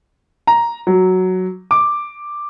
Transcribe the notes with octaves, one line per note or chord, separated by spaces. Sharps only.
A#5
F#3
D6